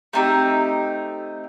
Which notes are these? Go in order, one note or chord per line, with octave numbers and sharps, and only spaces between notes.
A3 C4 D#4 G4